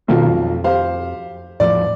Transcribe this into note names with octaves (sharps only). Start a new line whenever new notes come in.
B1 B2 D#3 C4 F4
F2
G4 C5 F5
E2 A2 F3 D5